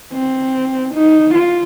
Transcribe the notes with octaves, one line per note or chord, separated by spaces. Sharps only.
C4
D#4
F4